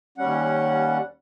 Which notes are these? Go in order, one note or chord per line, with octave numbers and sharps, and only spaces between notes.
D#2 G3 C#4 F#5